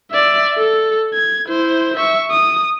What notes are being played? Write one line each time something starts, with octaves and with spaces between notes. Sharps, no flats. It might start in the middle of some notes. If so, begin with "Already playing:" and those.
D5 E5
A4
G#6
E4 C5
E5 C#6
D#6